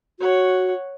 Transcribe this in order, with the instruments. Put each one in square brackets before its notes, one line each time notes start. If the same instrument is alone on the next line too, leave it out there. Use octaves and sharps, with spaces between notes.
[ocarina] F#4 [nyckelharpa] C#5 F#5